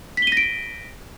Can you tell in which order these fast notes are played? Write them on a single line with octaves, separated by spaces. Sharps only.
B6 G7 D#7 A#6 D7